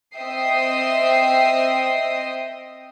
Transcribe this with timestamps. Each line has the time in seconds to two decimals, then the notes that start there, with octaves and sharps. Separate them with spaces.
0.16 C4 D#5 E5 G5 D#6 C7